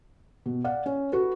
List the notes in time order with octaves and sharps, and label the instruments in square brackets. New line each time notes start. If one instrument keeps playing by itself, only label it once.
[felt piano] B2
D5 F5 F#5
C#4
F#4 A4 B4